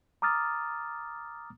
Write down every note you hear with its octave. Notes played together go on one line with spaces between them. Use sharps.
A#5 D6 D#6 F6 A6